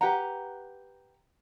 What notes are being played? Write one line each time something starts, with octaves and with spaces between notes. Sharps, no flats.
G4 B4 F#5 A#5